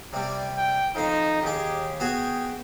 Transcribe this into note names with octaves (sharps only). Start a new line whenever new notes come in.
C3 G3 D5
G5
F2 D#4 C5
D#2 G4 G#4
B3 F#4 G#4 G5